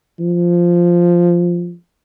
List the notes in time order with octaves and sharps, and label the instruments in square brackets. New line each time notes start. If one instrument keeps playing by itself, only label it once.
[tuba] F3